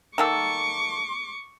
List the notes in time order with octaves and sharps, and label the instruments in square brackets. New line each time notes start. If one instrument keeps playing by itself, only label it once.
[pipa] D#3 A#3 A4 [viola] C#6 D6